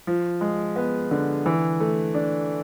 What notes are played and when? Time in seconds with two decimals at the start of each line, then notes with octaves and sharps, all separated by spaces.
0.07 F3
0.41 G#3
0.76 B3
1.11 D3
1.46 E3
1.80 A3
2.15 D4